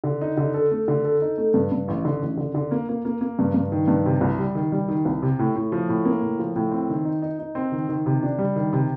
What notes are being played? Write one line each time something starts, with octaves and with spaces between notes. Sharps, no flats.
D3
D#4
D3
A4
A3
D3
A4
D#4
A3
G2
G2
A1
D3
A1
D3
D3
A#3
A#3
A#3
A#3
G2
G2
D#3
G2
C3
C2
G3
D#3
G3
D#3
C2
C3
A2
A2
F3
A2
A#3
A2
F3
A2
C4
D#3
D#4
D#4
D#4
C4
D#3
D#3
C3
D4
G3
D#3
C3